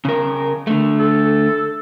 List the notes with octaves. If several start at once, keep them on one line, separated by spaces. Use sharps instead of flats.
C#3 A#4
D3 A3
A4